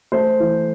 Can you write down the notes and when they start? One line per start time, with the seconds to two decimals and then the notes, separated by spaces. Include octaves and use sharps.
0.12 A3 C5
0.40 E3